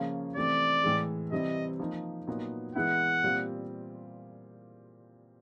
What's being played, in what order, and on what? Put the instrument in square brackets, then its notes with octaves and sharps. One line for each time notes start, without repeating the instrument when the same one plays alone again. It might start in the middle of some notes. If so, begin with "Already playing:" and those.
Already playing: [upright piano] C#3 F3 A#3 C#4 F4
[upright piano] C3 E3 A3 C4 [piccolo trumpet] D5
[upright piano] A2 E3 G#3
[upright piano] C3 E3 G3 C4 E4 [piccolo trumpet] D#5
[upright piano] F3 A#3 D#4
A#2 F#3 B3 D#4
[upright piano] E3 G#3 B3 E4 [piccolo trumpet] F#5
[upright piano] A#2 G3 C4 F4